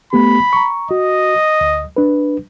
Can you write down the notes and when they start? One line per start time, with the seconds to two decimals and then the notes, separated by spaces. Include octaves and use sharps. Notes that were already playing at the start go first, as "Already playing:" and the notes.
0.13 A3 B3 G4 B5
0.53 A#5 C#6
0.91 F#4 D#5
1.61 D2
1.97 D4 B4